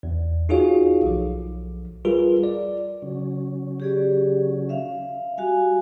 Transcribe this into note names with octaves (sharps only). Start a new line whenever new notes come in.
E2
D#4 F4 F#4 G#4 C#5 F5
B1 F3
G3 F4 G#4 A#4 B4
D5
C#3 F#3 C#4
G4 G#4 D5
E5 F5
G3 F#4 F5 G#5